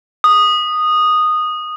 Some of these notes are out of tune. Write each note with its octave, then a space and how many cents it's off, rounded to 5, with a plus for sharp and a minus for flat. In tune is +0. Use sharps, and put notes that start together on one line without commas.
D#6 -10